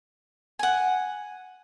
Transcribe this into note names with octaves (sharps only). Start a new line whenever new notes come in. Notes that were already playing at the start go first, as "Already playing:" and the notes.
F#5 G#5